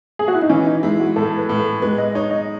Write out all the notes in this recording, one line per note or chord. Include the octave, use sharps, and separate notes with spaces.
G#4
F#4
E4
D#4
E3 C#4
D#4
G#3 E4
F#4
A2 A4
B4
A2
A4
G#3 B4
D#5
D#4 C#5
D#5